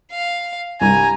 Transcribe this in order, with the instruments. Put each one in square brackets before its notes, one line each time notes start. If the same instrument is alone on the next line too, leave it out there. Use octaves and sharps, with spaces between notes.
[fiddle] F5
[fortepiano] C2 G2 [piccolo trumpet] G#5 [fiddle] A#5